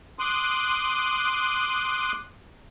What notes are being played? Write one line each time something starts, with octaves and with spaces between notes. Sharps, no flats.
C6 D6 D#6 F#6